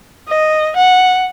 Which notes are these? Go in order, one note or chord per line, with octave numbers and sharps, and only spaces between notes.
D#5
F#5